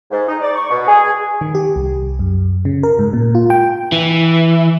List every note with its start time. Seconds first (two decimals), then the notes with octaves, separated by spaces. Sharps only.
0.11 G#2
0.26 D#4
0.41 D5
0.54 C#6
0.70 B2
0.87 G#4
1.41 D#3
1.55 G4
1.76 C2
2.19 F#2
2.65 C#3
2.83 A#4
2.99 G#2
3.13 A#2
3.35 F4
3.50 G5
3.92 E3